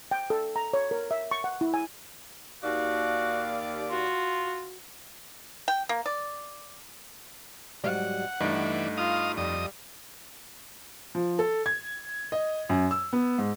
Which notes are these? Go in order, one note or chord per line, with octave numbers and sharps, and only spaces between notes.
G5
A4
A#5
C#5
A#4
E5
C#6
F#5
E4
G#5
D#2 F#4 D5 F5
F4 F#4
G5
A#3
D5
G#2 F#3 G3 F#5
G2 E3 A3 D#4 D5
F4 D#5 F5 D#6
F2 G3 D#5 D#6
F3
A4
G#6
D#5
F#2
E6
B3
G#2